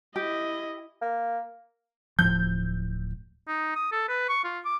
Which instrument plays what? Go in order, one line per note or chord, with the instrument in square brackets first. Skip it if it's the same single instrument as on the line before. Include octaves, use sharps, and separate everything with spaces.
[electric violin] E4 D#5 [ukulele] G4
[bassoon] A#3
[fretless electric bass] D1 A2 F3 [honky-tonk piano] G6
[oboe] D#4
D#6
A4
B4
C#6
F4
D6